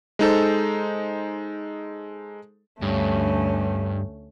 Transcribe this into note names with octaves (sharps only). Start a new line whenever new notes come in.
G#3 D#4 A4 C5
D2 G2 A3 C#4